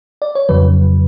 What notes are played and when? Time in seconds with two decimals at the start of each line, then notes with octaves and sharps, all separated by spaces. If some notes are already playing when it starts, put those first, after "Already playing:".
0.22 D5
0.35 C#5
0.49 F2 C#3 F#3 B4